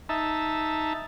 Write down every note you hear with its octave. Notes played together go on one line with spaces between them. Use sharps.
D#4 E5 A5